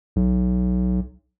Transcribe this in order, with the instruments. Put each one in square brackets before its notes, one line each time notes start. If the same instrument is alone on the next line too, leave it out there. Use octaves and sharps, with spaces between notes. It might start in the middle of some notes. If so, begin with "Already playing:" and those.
[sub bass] B1